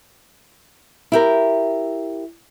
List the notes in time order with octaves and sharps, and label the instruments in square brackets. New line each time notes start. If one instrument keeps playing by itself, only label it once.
[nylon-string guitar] E4 G4 A#4